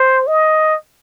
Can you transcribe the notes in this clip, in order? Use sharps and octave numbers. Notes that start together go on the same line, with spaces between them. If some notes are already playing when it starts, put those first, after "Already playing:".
Already playing: C5
D#5